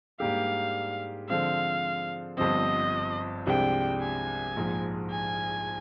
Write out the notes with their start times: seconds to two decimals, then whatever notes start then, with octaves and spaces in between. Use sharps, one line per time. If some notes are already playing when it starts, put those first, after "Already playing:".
0.20 G#2 G3 A#3 D4 G4 F5
1.29 D3 F3 G#3 C4 F5
2.38 G1 G2 F3 C4 D#5
3.46 C2 C3 F3 G#3 D4 G5
4.01 G#5
4.56 A#1 G#2 F3
5.11 G#5